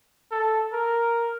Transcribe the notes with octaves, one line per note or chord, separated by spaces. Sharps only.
A4
A#4